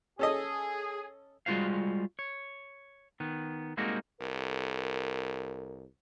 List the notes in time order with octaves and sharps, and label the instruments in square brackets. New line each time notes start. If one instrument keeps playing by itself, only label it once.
[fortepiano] C#4 A4 D#5 [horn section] G#4
[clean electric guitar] G3 G#3 F4 F#4 C5 F5
C#5
D#3 B3
G3 G#3 A#3 C4 D#4 F#4
[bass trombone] C2 [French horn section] A4 A#4